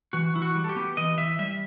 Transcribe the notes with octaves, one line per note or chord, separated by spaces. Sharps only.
E3 F#4
E3 E4
F#4
G3
A4
G4
B3
E3 D#5
E3 E5
G3 E5